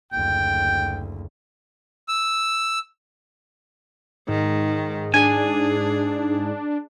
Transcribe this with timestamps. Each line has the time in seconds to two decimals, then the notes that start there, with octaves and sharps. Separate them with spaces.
0.13 F#1 D2 G5
2.08 E6
4.28 G#2 D#3
5.14 D4 G#4 G#5